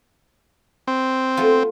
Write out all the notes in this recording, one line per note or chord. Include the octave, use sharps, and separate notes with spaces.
C4
A3 B3 F4